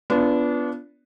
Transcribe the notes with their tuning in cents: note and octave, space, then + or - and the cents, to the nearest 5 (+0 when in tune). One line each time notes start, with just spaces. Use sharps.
B3 +0 D4 -25 F4 -30